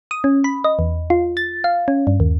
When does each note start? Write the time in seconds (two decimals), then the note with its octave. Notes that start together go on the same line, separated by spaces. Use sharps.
0.11 D#6
0.24 C#4
0.44 B5
0.64 D#5
0.79 E2
1.10 F4
1.37 A6
1.64 F5
1.88 C#4
2.07 G2
2.20 D#2